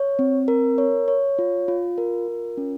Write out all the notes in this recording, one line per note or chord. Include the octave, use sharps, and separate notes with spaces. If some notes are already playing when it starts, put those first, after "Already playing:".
Already playing: C#5
C4
A#4
C#5
C#5
F4
F4
A#4
F4
C#4